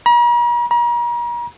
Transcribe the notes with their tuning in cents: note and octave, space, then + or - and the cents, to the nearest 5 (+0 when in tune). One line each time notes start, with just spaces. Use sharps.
A#5 +45
A#5 +40